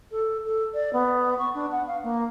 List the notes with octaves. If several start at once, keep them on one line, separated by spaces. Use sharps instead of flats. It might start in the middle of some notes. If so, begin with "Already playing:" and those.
A4
A4
D5
B3
C#6
D4
F#5
F5
A#3